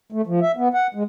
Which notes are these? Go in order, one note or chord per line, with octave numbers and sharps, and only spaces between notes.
A3
F3
E5
B3
F#5
G#3